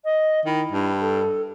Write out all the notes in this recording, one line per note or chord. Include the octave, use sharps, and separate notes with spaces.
D#5
D#3 E4
G2
A4